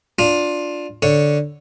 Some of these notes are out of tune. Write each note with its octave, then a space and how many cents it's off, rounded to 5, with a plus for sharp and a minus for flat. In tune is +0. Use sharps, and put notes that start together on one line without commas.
D4 +0 F4 +15
D3 +0 C#5 +0